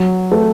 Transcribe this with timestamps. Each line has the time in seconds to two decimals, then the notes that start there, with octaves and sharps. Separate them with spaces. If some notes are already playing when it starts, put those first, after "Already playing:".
Already playing: F#3
0.32 A3